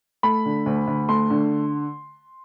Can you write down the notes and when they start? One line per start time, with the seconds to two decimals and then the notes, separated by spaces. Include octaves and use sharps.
0.23 A3 B5
0.45 D3
0.66 D2
0.87 D2
1.09 A3 C6
1.30 D3